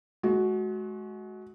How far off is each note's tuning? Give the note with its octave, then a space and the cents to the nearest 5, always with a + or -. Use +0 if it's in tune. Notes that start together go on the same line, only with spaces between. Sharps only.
G#3 +35 F#4 +0